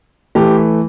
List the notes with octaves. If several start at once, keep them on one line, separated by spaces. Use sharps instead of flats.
E3 A3 G4